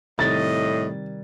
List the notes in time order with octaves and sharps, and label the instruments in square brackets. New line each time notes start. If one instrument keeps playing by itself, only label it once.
[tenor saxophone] A2 [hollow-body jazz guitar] C3 D#3 G3 [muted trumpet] D#5 [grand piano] A6